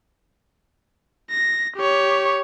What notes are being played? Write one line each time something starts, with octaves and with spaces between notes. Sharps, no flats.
A#6
G4 C#5